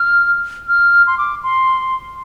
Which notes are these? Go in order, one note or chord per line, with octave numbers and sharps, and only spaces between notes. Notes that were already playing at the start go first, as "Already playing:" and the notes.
Already playing: F6
F6
C6
D6
C6